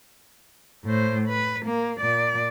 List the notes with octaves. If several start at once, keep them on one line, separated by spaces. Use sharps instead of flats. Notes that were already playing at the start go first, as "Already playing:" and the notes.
A2 C5
B4
A#3
A#2 D5